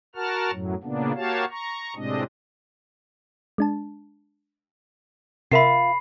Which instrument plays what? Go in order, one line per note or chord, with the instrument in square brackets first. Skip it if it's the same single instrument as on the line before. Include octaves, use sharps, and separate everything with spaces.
[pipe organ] F#4 A#4 F#5 A5 F6
F#2 A2 F#3
A#2 C#3 A#3 B3 D4
A#3 F#4 G4 C#5 F5 A5
A#5 C#6
A2 C3 G#3 C4 D4 D#5
[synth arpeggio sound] G#3 D4 A5
[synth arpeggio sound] C3 A#4 [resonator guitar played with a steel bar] F4 E5 F5 [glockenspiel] B5 C7